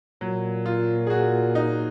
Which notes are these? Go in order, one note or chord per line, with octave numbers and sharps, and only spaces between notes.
A#2 F#3
F4
G#4
F#4
D#4